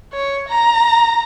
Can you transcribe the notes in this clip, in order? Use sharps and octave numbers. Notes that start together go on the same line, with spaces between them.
C#5
A#5